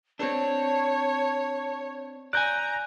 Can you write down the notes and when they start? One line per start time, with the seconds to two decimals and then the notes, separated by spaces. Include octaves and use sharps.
0.19 C4 D4 C#5 A5
2.33 D5 G#5 A#5 F#6 G6